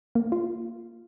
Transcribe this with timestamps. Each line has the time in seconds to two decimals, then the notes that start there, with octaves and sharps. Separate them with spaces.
0.15 A#3
0.32 F4